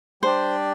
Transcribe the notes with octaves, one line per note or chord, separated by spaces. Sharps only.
G3 D4 G4 C5 D5